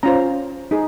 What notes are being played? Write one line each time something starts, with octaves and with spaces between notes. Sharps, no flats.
C#4 F4 C5 A#5
D#4 G#4